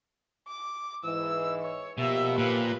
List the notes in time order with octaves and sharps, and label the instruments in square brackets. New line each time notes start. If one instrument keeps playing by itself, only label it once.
[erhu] D6
[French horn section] G#2 E3 [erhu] E6
[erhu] C#5
[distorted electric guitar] B2 [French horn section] F3 A#3 G4 [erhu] E5
[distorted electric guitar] A#2 [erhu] B4